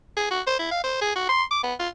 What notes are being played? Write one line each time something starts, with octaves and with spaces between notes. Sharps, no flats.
G#4
F#4
C5
E4
F5
C5
G#4
F#4
C6
D6
B3
F4